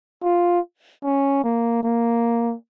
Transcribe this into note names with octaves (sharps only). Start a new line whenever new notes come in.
F4
C#4
A#3
A#3